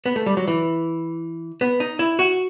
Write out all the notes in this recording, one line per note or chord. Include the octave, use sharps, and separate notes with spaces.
B3
A3
G3
F#3
E3
B3
D#4
E4
F#4